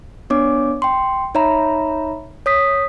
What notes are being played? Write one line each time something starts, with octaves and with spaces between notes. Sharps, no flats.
B3 D4 C#5 D6
G5 C6
D#4 C#5 E5 A#5 B5
C#5 D#6 B6